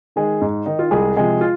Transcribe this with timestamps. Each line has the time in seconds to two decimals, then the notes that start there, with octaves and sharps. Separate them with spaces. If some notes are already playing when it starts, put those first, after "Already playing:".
0.16 D#3 G#3 G#4
0.41 G#2
0.66 D#3 D#4
0.79 F4
0.91 C2 G#3 G#4
1.16 C3 F3 G#3 G#4
1.41 F4